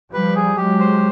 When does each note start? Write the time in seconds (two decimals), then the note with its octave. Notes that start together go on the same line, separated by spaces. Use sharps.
0.12 F3 G3 B4
0.36 G#4
0.57 F#3 G#3 G4
0.80 C5